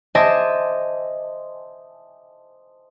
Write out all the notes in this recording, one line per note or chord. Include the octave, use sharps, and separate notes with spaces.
C5 D#5 E5 G#5 A5 D6